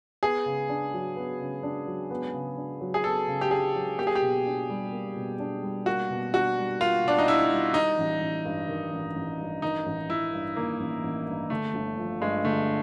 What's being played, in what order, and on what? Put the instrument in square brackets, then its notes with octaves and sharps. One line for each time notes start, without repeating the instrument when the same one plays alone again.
[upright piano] B3 [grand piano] G#4
[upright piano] C#3
D4
F#3
B3
C#3
D4
F#3
B3
C#3
D4
F#3
[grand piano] G#4
[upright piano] B3 [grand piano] A4
[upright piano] C#3
[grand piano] G4
[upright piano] D4 [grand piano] G#4
[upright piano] F#3
[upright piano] A#3 [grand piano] G4
[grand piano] G#4
G4
[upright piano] B2
D4
G3
A#3
B2
D4
G3
[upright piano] A#3 [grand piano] F#4
[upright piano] B2
[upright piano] D4 [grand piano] F#4
[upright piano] G3
[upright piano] A#3 [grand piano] F4
[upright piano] B2 [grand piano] D4
[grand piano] D#4
[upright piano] D4 [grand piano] E4
[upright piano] G3
[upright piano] D#3 [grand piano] D#4
[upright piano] A1
A1
G2
D#3
A1
A1
G2
[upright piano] D#3 [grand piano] D#4
[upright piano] A1
[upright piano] A1 [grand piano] E4
[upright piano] G2
[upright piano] D#3 [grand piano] A#3
[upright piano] A1
A1
G2
[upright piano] D3 [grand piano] A3
[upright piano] G1
F3
[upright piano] G2 [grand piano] G#3
[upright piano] D3 [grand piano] A3